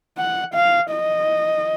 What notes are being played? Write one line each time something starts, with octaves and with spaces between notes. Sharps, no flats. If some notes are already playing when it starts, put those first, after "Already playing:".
F#5
F5
D#5